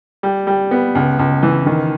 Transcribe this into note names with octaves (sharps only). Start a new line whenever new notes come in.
G3
G3
B3
C#2
C#2
E3
D#3